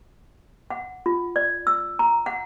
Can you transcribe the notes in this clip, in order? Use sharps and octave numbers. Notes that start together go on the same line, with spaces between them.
F#5
F4
D5
E6
A#5
F#5